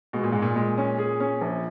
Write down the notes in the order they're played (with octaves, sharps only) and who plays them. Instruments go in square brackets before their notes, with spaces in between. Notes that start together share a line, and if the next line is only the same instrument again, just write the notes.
[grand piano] B2 [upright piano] G#3
[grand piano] A#2
[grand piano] G#2 [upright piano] G#3
[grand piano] A#2
[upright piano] G#3
C#4
G#4
C#4
A#1